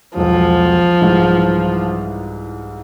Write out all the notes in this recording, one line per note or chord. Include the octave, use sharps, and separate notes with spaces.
E1 B1 F3
C2 G#2 E3